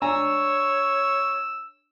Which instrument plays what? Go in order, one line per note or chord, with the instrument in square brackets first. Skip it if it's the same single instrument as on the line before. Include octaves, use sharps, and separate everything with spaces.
[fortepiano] D4 G#5 A#5 [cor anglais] C#5 [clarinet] E6